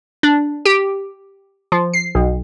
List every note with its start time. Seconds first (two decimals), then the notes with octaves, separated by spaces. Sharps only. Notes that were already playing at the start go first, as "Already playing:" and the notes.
0.23 D4
0.65 G4
1.72 F3
1.93 C7
2.15 B1